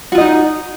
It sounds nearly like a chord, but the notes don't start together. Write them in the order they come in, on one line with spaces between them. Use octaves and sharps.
F#4 F4 D#5 D#4